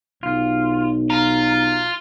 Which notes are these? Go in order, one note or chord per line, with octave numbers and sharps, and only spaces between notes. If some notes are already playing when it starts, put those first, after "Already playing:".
B1 F4
F4 A#5